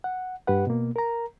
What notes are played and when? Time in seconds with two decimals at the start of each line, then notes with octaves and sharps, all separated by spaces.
0.04 F#5
0.47 G2 G4 B4 F#5
0.67 B2 A#3
0.96 A#4 A#5